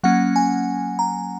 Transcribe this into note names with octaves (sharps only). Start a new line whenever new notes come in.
F#3 A#3 C#4 F#5
G#5
A#5